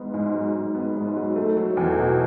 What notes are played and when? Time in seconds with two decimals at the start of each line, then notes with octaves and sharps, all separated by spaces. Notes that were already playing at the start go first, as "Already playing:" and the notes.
Already playing: G#2 B3
0.14 G#2
0.34 F#3
0.54 G#2
0.75 B3
0.96 G#2
1.16 F#3
1.36 A3
1.56 F#3
1.77 E2
1.99 B2